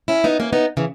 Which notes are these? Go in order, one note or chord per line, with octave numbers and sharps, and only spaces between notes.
C#4 E4
B3 D#4
A#3 C#4
B3 D#4
C#3 E3